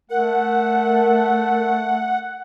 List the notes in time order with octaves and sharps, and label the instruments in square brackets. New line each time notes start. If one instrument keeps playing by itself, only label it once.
[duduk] A3 [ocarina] A#4 [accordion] F#5